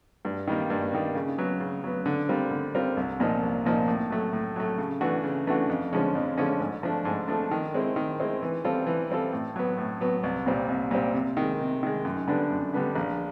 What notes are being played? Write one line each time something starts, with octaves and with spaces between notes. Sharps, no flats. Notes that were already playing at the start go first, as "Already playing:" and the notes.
G2
D#3 G3 A#3
G2
D#3 G3 A#3
C#3
F#3 B3
C#3
F#3 B3
D3
G3 C4 F4 A#4
D3
G3 C4 F4 A#4
C2
A#2 F3 A#3 D#4
C2
A#2 F3 A#3 D#4
A2
F#3 A3
A2
F#3 A3
C#3
E3 A3 D4 F#4
C#3
E3 A3 D4 F#4
F2
D3 F3 G#3 C#4
F2
D3 F3 G#3 C#4
G#2
F3 A3 D4
G#2
F3 A3 D4
D#3
G#3 C4 E4
D#3
G#3 C4 E4
E3
G3 C4 F4 A4
E3
G3 C4 F4 A4
A2
F#3 B3
A2
F#3 B3
C2
A#2 G3 C4
C2
A#2 G3 C4
C3
D#3 G#3
C3
D#3 G#3
F#2
D3 G3 B3 D4
F#2
D3 G3 B3 D4
A#1